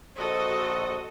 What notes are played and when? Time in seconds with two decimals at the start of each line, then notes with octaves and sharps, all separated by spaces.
0.16 A#1 F#4 A4 C5 D#5